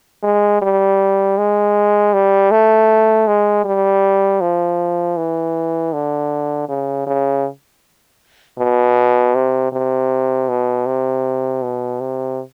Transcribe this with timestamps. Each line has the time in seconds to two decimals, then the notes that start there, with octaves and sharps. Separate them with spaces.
0.23 G#3
0.62 G3
1.38 G#3
2.13 G3
2.51 A3
3.27 G#3
3.65 G3
4.41 F3
5.17 E3
5.93 D3
6.69 C#3
7.07 C#3
8.58 B2
9.35 C3
9.72 C3
10.48 B2
10.86 C3
11.62 B2
12.00 C3